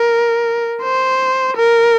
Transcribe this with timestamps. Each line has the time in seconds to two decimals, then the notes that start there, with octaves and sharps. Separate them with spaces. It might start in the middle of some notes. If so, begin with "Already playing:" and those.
Already playing: A#4
0.83 C5
1.57 A#4